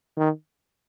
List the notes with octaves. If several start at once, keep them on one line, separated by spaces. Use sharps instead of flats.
D#3